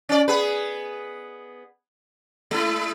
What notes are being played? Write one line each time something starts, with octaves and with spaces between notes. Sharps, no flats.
C#4 D5
B3 G#4 B4
G#3 E4